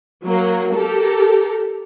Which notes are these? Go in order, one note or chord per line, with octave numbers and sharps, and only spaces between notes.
F#3 A#3
G4 A4 A#4